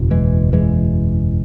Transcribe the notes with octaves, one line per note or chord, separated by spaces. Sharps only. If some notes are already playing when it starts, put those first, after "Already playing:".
Already playing: F#1 E2 B2
E3 G#3
E3 G#3